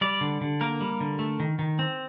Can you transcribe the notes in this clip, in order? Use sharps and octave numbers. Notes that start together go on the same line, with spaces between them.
G3 D5
D3
D3
A#3 A#4
G3
D3
A3
D#3
D#3
C4